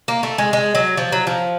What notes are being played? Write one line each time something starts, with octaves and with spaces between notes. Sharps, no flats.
A#3
A3
G#3
G#3
F#3
F3
F#3
F3